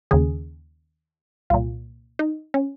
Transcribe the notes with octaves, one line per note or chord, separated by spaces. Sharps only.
D#2 C#3 G#4
C2 A#2 F4
D#4
C#4